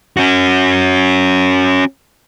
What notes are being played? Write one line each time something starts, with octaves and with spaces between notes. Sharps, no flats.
C#4 F#4